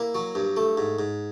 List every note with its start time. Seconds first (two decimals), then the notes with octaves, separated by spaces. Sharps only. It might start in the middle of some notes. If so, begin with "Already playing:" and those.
Already playing: A#3 E4
0.15 F#3
0.35 G2
0.56 A3
0.77 G#2
0.99 G#2